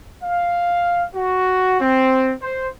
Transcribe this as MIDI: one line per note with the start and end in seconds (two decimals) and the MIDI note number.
0.23 1.04 77
1.15 1.80 66
1.81 2.33 60
2.42 2.68 72